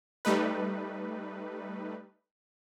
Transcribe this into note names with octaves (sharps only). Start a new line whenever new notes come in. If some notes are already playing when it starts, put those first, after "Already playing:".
G3 A3 D#4 B4